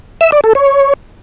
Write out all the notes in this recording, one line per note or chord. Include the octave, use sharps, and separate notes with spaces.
E5
D5
A4
C#5